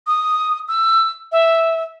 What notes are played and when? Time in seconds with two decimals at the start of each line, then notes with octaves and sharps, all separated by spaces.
0.07 D#6
0.68 E6
1.32 E5